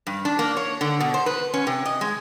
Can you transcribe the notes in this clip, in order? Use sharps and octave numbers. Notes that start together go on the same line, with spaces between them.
G2
D4
A#3
C#5
D3
B2
C5
B4
C#4
C3
D#5
G#3